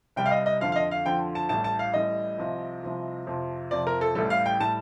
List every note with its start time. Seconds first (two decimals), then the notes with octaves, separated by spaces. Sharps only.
0.16 C2 C3 G3 G5
0.26 F5
0.31 D#5
0.46 D#5
0.61 F2 D3 F3 F5
0.72 F5
0.76 D#5
0.91 F5
1.06 F2 D3 F3 G5
1.35 A5
1.49 A1 A2 G3 A5
1.64 A5
1.79 F5
1.94 A1 A2 G3 D#5
2.38 C2 C3 F3
2.83 C2 C3 F3
3.27 F2 C3 F3
3.71 F2 C3 F3 D5
3.87 A#4
4.01 A4
4.15 A1 A2 G3 A4
4.30 F5
4.46 G5
4.60 A2 G3 A5